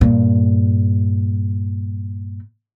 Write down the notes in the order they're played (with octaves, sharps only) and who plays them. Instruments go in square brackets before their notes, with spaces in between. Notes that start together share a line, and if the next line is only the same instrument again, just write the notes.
[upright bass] G2 A#2